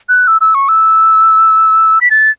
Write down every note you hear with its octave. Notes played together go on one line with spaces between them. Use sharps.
F#6
E6
E6
C#6
E6
B6
A6